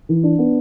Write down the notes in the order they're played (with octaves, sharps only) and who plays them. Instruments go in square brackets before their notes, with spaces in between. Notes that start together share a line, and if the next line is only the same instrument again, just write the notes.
[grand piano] E3
D4
B3